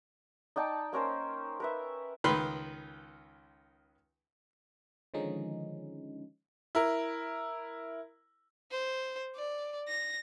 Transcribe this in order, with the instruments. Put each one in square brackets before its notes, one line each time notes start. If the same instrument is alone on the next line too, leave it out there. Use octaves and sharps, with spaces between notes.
[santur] D#4 D5 G5 A5
A#3 C#4 A#4 C5
A#4 B4 E5
[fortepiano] C#2 D#3 B4 B5 C6
[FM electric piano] D3 D#3 F3 G#3 C#4 D#4
[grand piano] E4 A#4
[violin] C5
D5
A#6